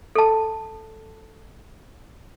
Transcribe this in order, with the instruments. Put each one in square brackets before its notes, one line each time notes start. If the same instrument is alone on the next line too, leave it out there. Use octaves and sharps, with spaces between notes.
[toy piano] A4 A5